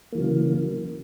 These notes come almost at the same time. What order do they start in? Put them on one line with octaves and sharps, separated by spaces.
A#3 E3 F#3 C#3